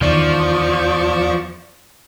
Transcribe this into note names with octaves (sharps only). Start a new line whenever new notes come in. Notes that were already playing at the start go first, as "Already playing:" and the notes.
E2 D#3 F3 D5 C#6